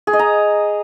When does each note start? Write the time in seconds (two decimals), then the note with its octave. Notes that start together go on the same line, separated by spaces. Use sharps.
0.07 G#4
0.13 D#5
0.19 A#5